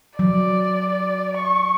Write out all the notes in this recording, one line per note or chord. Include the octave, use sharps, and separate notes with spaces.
F#3 D5
C#6